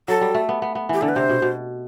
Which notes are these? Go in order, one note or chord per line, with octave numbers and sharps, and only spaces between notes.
F#3 A4
G3
A3
B3
B3
B3
E3 G4
D3 A4
B4
C3 C5
B2
B2